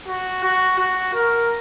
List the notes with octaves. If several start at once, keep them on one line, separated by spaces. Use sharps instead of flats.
F#4
F#4
F#4
A#4